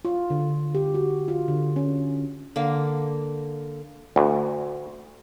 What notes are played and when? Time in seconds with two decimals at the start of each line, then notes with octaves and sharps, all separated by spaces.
0.05 F4
0.30 D3
0.75 G4
0.94 F#4
1.28 F4
1.48 D3
1.76 C#4
2.56 D3 A#3
4.16 D2